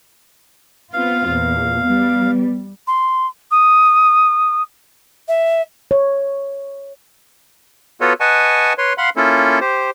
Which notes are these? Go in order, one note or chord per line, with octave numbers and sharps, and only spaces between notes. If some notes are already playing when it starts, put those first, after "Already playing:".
B3 C4 F4 F5
E2 A#2
G3 B3
C6
D#6
E5
C#5
B3 F4 F#4 A4 B4 C#5
B4 D#5 F#5 G#5 A5 C#6
B4 C#5 C6
F5 F#5 B5 C6
A#3 C#4 E4 F4 A4
G4 C5